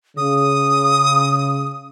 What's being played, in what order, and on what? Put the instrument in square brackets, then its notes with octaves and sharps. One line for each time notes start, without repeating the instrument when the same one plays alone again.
[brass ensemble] C#3 [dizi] D#6